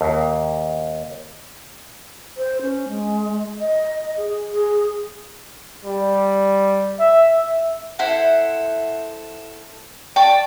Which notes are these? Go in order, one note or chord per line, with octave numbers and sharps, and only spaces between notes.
D#2
C5
C#4
G#3
D#5
D#5
G#4
G#4
G3
E5
E5
E4 A4 C5 F#5
D5 G5 A5 C#6